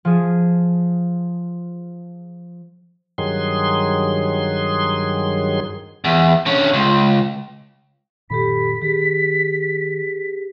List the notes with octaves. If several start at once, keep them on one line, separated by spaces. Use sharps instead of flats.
F3 G#4
G2 D#3 F#3 G#4 C6
E2
D3 C#4
C#2
F#1 A#2 D#3 G4 A4 B5 B6
D#3 G4 G#4